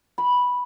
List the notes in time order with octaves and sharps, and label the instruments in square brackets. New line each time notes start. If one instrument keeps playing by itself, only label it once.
[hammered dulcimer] B5